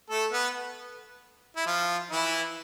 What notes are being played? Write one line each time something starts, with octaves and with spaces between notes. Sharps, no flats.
A3 A4
B3 B4
E4
F3 F4
E3 E4